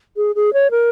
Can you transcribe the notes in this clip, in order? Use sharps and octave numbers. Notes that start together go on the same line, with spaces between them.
G#4
G#4
C#5
A#4